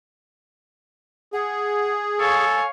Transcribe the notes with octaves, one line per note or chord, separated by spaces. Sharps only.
G#4 F#5
A4 C#5 F5 G#5